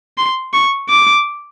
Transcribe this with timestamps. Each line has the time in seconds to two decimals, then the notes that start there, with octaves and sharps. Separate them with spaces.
0.18 C6
0.53 C#6
0.89 D6